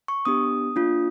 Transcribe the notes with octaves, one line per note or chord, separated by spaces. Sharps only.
C#6
B3 D4 G4 D#6
A#3 D4 F4